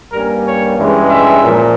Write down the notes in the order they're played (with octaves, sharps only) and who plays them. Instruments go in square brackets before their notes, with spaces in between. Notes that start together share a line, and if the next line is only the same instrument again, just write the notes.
[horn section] G2 G3 A#3 C#4 A#4
C#5
G2 E3 G#3 C#4
E5
A#2 F3